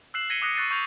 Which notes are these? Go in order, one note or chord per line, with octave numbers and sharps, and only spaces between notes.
E6 F#6 C7 E7 F#7
G#6 A#6 B6 C#7 D#7 G7
D6 D#6 F#6 A#6 C#7
C#6 F#6 A6 C7 D#7
C#6 G6 F7 F#7